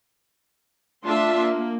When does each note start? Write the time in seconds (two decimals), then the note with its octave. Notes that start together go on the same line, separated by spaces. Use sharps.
1.04 A3 D4 F4 E5 A5 C6
1.38 A#3